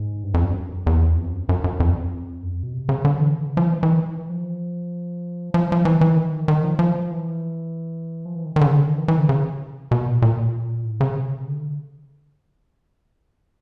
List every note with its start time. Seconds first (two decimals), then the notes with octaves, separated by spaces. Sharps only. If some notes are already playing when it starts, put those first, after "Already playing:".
Already playing: G#2
0.24 G2
0.34 F2
0.45 F#2
0.51 G2
0.55 F#2
0.86 E2
1.17 F2
1.33 F#2
1.49 F#2
1.64 F#2
1.80 F2
2.42 F#2
2.53 F2
2.63 B2
2.73 C3
2.89 C#3
3.05 D3
3.20 E3
3.36 D3
3.46 C#3
3.57 F3
3.67 E3
3.83 E3
4.30 F3
5.54 F3
5.72 F3
5.85 E3
6.01 E3
6.16 D#3
6.48 D#3
6.63 F3
6.79 F3
7.11 E3
8.25 F3
8.36 E3
8.45 D#3
8.56 D#3
8.61 D3
8.66 C#3
8.77 D3
8.87 D#3
8.97 E3
9.08 E3
9.18 D3
9.29 C#3
9.91 B2
10.07 A#2
10.22 A#2
10.85 A2
11.01 C#3
11.16 C3
11.31 C#3
11.48 D3